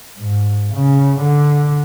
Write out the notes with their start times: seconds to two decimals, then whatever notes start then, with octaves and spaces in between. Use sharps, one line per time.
0.18 G#2
0.74 C#3
1.21 D3